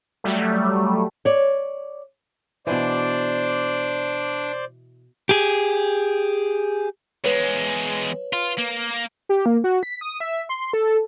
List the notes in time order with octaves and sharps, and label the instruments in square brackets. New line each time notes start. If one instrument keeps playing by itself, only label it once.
[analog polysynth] F#3 G3 A3
[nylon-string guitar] C#5 D5
[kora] B2 E3 [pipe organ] D4 [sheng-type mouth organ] C5 D5
[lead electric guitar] G4 G#4
[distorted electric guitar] E2 G#3 [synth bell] B4 C#5
[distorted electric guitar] F4
A#3
[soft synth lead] G4
A#3
F#4
B6
D#6
E5
C6
A4